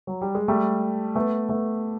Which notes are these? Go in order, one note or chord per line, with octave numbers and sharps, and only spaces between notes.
F#3
G3
G#3
G3 A3
A3 B3
A3 B3